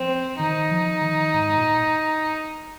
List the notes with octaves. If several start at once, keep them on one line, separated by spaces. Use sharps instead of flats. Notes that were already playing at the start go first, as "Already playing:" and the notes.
Already playing: F3 C4
D#3 D#4
F3
D#3
G#2
A#2